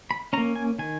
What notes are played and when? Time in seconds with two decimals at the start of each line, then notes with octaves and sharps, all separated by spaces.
0.11 B5
0.33 C#4 A#5
0.37 A#3
0.56 G#5
0.79 D#3 G#5